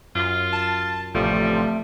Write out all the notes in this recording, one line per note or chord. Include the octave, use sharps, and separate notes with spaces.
F#2 F4
A5
A1 C3 F3 G3 A3
A3